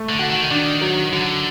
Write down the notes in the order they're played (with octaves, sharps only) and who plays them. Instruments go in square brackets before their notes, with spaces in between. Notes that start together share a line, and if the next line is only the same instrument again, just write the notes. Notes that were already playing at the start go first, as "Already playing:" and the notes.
Already playing: [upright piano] A3
[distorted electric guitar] D3
[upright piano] F#4
[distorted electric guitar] D#3
[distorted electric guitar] D#3 [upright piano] D4
[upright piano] F#3
[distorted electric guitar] D3 [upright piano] F#3